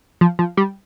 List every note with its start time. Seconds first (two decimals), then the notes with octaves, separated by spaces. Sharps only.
0.21 F3
0.39 F3
0.57 G3